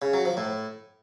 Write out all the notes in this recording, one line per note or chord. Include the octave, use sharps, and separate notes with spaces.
C#3
F#3
F3
A2